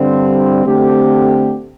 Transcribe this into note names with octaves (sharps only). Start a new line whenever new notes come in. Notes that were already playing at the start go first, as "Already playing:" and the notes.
Already playing: G2 D3 G3 C4
D3 A3 C4 G4